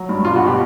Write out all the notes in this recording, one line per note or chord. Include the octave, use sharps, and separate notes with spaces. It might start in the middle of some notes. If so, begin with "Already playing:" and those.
Already playing: F#3
G2
B2 F4
F#4
B2
G4